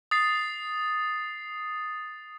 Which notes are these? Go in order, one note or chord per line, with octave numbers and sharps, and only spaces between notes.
D#6 A6 C7